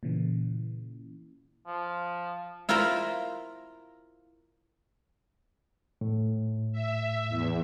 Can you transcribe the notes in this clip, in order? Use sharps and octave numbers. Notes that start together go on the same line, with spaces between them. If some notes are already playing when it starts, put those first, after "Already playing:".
A#2 C#3 E3
F3
E4 F4 A#4 C5 A#5 B5
A2
E5
E2